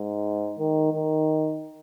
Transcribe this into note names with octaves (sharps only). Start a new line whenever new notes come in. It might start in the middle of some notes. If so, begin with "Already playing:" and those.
Already playing: G#2
D#3
D#3